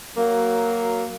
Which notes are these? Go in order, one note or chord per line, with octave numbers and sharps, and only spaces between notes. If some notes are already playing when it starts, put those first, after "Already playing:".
F#3 A#3